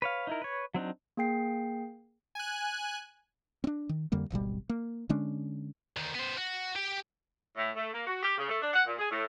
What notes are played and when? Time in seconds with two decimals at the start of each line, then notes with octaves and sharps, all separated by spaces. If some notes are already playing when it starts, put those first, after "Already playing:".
0.02 B4 C#5 F5
0.27 D#4 E4 A#4
0.42 B4 C#5
0.74 F#3 C4 D4 D#4
1.17 A#3 G#4 G5 C7
2.35 G#5 F#6
3.64 C4 D4
3.89 D#3
4.12 F2 D3 G3 A#3
4.30 D1 G#1 B2 G3
4.69 A#3
5.09 D3 G#3 C#4 D4
5.97 D2 D#3
6.15 B3 C5
6.38 F#4
6.75 G4 G5
7.56 A2
7.75 A3
7.92 A#3
8.06 F#4
8.23 G4
8.37 C#3
8.49 A3
8.61 D4
8.73 F#5
8.86 A#2
8.98 G#4
9.11 A2